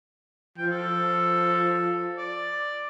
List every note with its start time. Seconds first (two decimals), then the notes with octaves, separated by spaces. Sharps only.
0.58 F3 G5
0.71 A4
2.17 D5